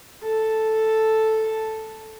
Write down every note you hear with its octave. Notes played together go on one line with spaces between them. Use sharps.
A4